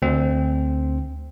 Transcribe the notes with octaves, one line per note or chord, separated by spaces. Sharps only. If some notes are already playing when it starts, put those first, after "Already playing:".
D2 C4